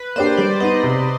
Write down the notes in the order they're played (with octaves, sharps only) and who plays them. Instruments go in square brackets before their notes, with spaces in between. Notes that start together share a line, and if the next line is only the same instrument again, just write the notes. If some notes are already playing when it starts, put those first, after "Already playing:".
Already playing: [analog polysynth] B4
[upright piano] A#3 D4 G4 [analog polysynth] C5
[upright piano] G3 [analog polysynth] D5
[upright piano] B3 D#4 [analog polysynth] D#5
[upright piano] C3